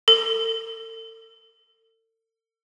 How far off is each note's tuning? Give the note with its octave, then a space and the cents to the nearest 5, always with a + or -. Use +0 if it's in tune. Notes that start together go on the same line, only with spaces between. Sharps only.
A4 +40